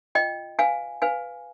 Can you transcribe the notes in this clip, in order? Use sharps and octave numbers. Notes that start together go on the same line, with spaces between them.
F4 D#5 G5
B4 F5 G#5
B4 F5 G#5